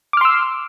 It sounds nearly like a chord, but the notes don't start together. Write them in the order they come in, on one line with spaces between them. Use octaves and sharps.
D6 F6 C6 E6